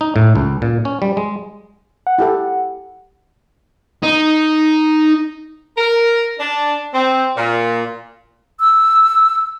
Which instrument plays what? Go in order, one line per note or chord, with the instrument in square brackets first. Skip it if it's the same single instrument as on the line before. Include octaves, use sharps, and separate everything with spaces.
[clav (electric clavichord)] D#4
A2
C#2
A#2
C#4
G3
G#3
[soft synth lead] F#5
[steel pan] E4 G4 A4
[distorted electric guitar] D#4
[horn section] A#4
D4
C4
A#2
[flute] E6